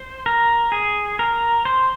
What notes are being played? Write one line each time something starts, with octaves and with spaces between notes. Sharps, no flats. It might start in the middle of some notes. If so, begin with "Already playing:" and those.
Already playing: C5
A#4
G#4
A#4
C5